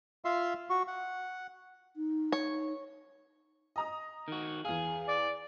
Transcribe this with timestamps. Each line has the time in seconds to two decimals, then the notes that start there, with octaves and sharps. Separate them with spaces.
0.25 F4 E5 F5 C6
0.70 F#4 C#6
0.87 F#5
1.96 D#4
2.32 C#5
3.76 D#5 A#5 D#6
4.28 D#3 F#4
4.65 E2 G#4 F5
5.08 D5